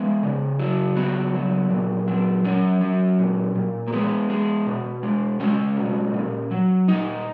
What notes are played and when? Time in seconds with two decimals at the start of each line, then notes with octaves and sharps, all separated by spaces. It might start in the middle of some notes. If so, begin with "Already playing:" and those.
Already playing: G#3 B3
0.23 C#3
0.59 F#3
0.97 C#3 B3
1.34 F#3
1.70 A#2
2.08 F#3
2.44 F#3 C#4
2.81 F#3
3.19 A#2
3.55 A#2
3.88 A#3
3.92 G#3 B3
4.30 G#3
4.67 B2
5.03 G#3
5.40 G#3 C#4
5.77 B2
6.14 A#2
6.51 F#3
6.88 A#2 D#4